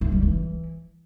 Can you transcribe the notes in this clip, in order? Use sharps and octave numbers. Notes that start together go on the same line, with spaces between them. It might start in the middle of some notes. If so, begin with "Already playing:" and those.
E3
G3
E3